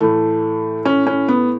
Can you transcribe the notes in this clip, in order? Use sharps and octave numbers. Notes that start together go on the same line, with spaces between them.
A2 E3 A3
C#4
C#4
B3